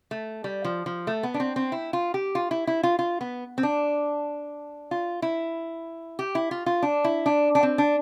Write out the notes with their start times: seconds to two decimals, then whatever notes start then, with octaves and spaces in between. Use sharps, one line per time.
0.11 A3
0.44 G3
0.65 F3
0.86 F3
1.07 A3
1.23 B3
1.34 D4
1.40 C4
1.56 C4
1.72 E4
1.93 F4
2.14 G4
2.35 F4
2.51 E4
2.67 E4
2.83 F4
2.99 F4
3.21 B3
3.58 C4
3.63 D4
4.91 F4
5.22 E4
6.19 G4
6.35 E4
6.51 F4
6.66 F4
6.82 D4
7.04 E4
7.26 D4
7.55 D4
7.63 C4
7.78 D4